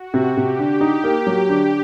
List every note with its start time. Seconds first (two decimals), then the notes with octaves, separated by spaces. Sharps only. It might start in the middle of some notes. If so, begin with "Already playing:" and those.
Already playing: F#4
0.14 C3
0.25 G4
0.37 C3
0.59 D3
0.81 D#4
1.04 A#3
1.27 F#3
1.49 D3